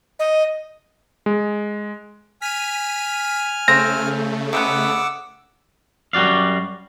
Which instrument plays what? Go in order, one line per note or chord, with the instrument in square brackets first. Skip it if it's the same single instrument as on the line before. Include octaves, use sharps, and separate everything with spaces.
[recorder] D#5
[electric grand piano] G#3
[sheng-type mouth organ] G#5 F6 [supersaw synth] B6 D#7
[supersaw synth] C#3 A3 [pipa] C4 [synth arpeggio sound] A#6
[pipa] C3 G#3 B3 [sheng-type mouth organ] F#5 D6 E6
[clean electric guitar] F#2 G3 F#4 D5 F5